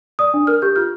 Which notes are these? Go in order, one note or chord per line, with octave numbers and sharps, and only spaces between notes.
D5 D#6
D4
A#4 F6
G4 G6
F4 F6